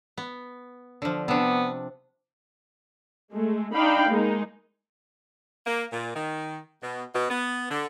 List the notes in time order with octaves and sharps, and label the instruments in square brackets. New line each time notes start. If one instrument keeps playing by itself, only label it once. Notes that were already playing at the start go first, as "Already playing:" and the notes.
[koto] B3
D3 F3
[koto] C3 D4 [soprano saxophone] B3
[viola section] G#3 A3
D4 D#4 F5 G5 B5
G#3 A#3 D#4
[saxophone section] A#3
A#2
D#3
B2
B2
B3
D3